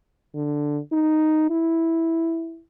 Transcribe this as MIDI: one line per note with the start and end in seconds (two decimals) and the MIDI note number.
0.35 0.79 50
0.92 1.48 63
1.51 2.61 64